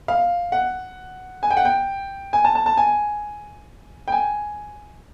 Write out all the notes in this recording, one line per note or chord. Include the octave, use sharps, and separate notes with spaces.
F5
F#5
G#5
G5
F#5
G5
G#5
A5
A5
A5
G#5
G5
G#5